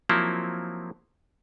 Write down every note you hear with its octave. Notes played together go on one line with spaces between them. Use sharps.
F3 F#3 A#3 C4 E4